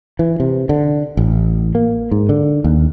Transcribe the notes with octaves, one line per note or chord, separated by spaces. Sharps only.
E3
C3
D3
A1
A#3
G#2
D3
D#2